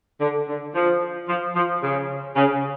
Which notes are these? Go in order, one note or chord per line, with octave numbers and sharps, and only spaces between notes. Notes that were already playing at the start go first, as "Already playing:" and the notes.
D3
D3
F3
F3
F3
C#3
C#3